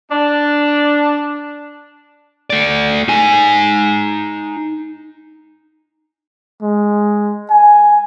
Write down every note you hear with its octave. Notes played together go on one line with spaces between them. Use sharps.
D4
A3 D5
D#4 G#5
G#3
G#5